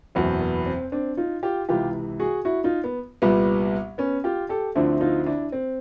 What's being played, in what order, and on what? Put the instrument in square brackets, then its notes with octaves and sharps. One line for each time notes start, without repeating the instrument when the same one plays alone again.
[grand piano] F#1 E2 B2 [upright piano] C4
[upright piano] B3
C4
C4 D4
D#4 F4
F4 G4
[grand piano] C#2 C3 E3 [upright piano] F4 G4
[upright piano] F#4 G#4
E4 F#4
D#4 F4
B3
[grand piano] C2 A#2 G3 B3
[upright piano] B3 C#4
F4 G4
G4 A4
[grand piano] D2 D3 F3 A3 C4 [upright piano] D4 E4
[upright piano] D#4 F4
D4 E4
C4